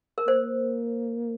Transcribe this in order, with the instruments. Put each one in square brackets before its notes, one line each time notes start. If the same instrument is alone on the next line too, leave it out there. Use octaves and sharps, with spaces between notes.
[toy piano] A#4
[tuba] A#3 [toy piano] C5